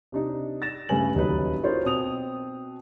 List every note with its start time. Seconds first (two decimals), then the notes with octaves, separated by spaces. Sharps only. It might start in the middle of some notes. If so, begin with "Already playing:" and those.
0.12 C3 D4 D#4
0.62 A6 A#6 E7
0.89 G2 C#3 A3 B4 G#5 F#7
1.15 D#1 F#3 D#4 B4
1.63 D#4 F4 F#4 A#4 C5 C#5
1.84 B2 C4 C5 D#6 F7